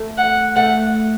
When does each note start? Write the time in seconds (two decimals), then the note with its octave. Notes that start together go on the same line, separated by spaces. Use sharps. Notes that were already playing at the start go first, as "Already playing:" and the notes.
Already playing: A3
0.18 F#5
0.56 A3 F#5